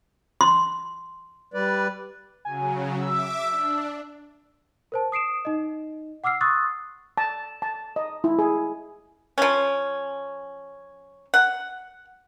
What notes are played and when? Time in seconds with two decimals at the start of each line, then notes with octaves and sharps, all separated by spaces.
0.41 C6
1.54 G3 B4 D5
2.45 C#3 F#3 G#5
3.00 E5 D6 E6
3.46 D4
4.92 A#4 C5 A5
5.12 D#6 C7 D7 E7
5.45 D#4 D#5
6.24 F#5 D6 E6 F6 C7
6.41 C6 C#6 D#6 E6 F#6 A6
7.17 A5
7.62 A5
7.96 D#5
8.24 E4
8.39 G#4
9.38 F3 C#4
11.34 F#5